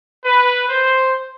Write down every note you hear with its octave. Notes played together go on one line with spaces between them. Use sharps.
B4
C5